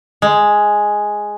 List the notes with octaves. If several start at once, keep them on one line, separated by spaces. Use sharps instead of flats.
G#3